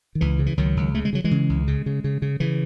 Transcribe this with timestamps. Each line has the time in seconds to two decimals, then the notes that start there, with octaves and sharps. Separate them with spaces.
0.15 D#3
0.21 C#2 E3
0.39 C#3
0.46 E3
0.57 C#2 D#3 F#3
0.77 C#2
0.95 C#3 A3
1.05 G#3
1.13 C#3 F#3
1.24 E3 G#3
1.31 C#3
1.49 C#2
1.68 C#3
1.86 C#3
2.04 C#3
2.22 C#3
2.40 C#3 E3